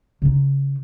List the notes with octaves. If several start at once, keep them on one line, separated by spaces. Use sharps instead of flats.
C#3 D#4